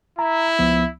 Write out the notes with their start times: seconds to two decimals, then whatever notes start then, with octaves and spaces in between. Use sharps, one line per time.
0.19 E4 A#5
0.59 C#2 F3 B3